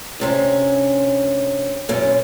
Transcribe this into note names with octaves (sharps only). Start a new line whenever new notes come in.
D2 C3 C#4
F#2 B2 C#4